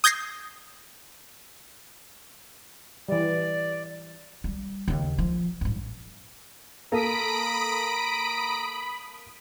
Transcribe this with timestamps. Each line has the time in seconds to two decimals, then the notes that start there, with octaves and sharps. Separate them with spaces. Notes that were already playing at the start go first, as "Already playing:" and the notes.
0.04 D#6 G6 G#6 A#6 C7
3.09 E3 G3 D5
4.44 G3
4.88 D#2 C#3
5.18 F3
5.61 A1 G2
6.92 A#3 A4 A#5 B5 D#6 B6 D7